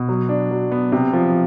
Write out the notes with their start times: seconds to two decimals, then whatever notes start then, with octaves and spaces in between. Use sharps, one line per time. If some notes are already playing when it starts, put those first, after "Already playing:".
Already playing: B2
0.09 F#3
0.29 D4
0.51 F#3
0.72 B3
0.92 C3
1.13 F3